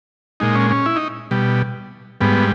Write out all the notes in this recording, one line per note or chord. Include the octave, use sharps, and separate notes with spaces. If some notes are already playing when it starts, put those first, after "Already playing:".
A#2 G#3 D#4
C#4
C#4
E4
D#4
B2 G3
G#2 G3 B3